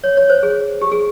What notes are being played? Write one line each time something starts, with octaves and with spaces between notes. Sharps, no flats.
C#5
C#5
C5
G#4
G4
G#4